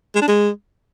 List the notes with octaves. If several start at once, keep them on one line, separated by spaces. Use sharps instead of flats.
G#3
D4
G#3